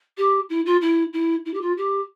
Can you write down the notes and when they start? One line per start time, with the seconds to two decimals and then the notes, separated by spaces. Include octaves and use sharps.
0.17 G4
0.49 E4
0.66 F4
0.81 E4
1.13 E4
1.45 E4
1.53 G4
1.61 F4
1.77 G4